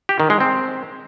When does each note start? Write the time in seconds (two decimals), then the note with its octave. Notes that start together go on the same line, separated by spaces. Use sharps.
0.09 G4
0.20 D#3
0.30 G#3
0.40 C4